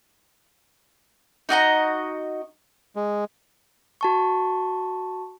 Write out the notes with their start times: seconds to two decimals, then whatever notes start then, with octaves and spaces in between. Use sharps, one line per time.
1.49 D#4 F#4 D#5 A#5
2.96 G#3
4.01 F#4 A5 C#6